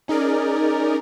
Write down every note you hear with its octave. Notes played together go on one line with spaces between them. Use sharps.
C#4 D#4 G#4 A#4 D5